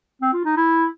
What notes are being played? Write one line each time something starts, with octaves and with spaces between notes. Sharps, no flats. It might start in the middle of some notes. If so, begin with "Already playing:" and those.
C4
F4
D#4
E4